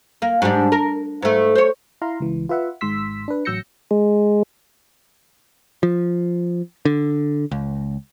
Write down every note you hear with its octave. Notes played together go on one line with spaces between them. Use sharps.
A#3
G#2 G3 D4
A#4
G#2 A3
C5 C#5
E4 F5 A#5 C6
C#2 E3
F4 B4 E5 F#5
G#1 G#2 C6 E6 B6
D4 B4
A1 F#3 E6 G6 A#6 C#7
G#3
F3
D3
C#2